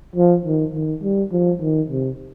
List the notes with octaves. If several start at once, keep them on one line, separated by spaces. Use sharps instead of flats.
F3
D#3
D#3
G3
F3
D#3
C3